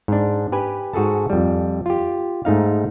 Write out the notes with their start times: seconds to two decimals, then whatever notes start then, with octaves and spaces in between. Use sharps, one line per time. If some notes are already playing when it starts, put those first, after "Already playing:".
0.08 G#2 D4
0.52 G4 B4 G#5
0.93 G#2 F#4 G#4 A4 A5
1.30 F2 G3
1.86 F4 G4
2.45 G#2 A3 D#4 F5